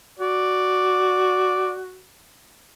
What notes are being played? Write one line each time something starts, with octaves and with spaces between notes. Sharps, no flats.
F#4 D5